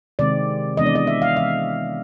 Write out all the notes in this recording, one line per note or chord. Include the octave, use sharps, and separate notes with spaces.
C3 D#3 G#3 C4 D5
C3 E3 G#3 B3 D4 D#5
D5
D#5
E5
F5
C3 E3 G#3 C4 E5